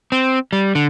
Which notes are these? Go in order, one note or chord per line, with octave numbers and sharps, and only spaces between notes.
C4
G3
D3